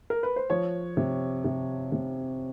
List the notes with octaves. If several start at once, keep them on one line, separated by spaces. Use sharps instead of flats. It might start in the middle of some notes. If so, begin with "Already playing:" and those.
A#4
B4
C5
F3 C#5
C3
C3
C3